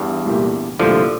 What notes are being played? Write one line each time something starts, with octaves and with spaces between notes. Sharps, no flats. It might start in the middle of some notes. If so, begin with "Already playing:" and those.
Already playing: E2 G2
C2 A#2 A3 E4 G4
C2 A#2 D3 F3 A3 E4 G4